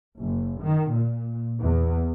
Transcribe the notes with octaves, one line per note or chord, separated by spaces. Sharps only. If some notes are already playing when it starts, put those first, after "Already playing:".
F#1
D#3
A#2
E2